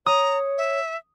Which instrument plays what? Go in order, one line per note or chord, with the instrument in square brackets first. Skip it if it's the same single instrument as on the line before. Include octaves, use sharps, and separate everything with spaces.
[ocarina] C#5 [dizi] A#5 [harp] D#6
[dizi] E5